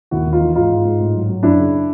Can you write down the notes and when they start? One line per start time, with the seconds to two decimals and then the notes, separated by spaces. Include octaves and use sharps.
0.11 D#2 E4 F#4
0.26 D#2
0.33 D#4 F4
0.40 E3
0.55 G#2 D#4 F4
0.71 G#2
0.85 G#2
1.00 A2
1.15 F#3
1.29 F#3
1.43 F#2 D4 E4
1.58 C#3